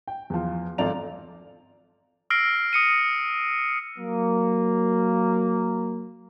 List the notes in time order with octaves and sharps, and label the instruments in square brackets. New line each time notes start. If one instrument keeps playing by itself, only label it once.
[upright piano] G5
E2 F3
G#1 F3 A4 D5 A#5 F7
[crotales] E6 F6 A#6 C7 D7
D#6 C#7 D#7
[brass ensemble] F#3 A#3